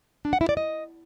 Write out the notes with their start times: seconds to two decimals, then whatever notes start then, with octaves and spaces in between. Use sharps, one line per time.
0.25 D4
0.33 F#5
0.41 E4
0.49 D5
0.57 D#5